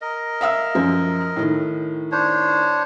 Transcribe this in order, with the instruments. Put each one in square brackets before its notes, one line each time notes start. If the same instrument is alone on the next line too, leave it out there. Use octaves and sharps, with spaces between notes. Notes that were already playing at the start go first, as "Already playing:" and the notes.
[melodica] A#4 D#5
[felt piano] E5 F5 E6
F#2 F3
A2 D#3
[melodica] D4 C5 C#5